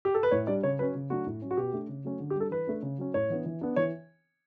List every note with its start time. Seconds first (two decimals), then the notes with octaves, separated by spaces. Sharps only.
0.05 G4
0.14 A4
0.23 B4
0.31 A2 C#5
0.47 G3 D4 D5
0.63 C#3 C#5
0.79 F#3 C#4 B4
0.95 C#3
1.10 F#3 A3 D4 F#4
1.26 A2
1.42 F#3 C#4
1.51 F#4
1.57 B2 G4
1.73 A3 D4
1.89 C#3
2.04 F#3 A3 C#4
2.20 D3
2.30 G4
2.35 G3 D4 A4
2.51 E3 B4
2.67 A3 D4
2.82 C#3
2.98 F#3 C#4
3.14 A2 C#5
3.30 E3 B3 D4
3.46 E3
3.61 B3 D4
3.76 E3 C#5